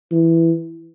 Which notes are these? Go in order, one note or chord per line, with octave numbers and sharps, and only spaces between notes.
E3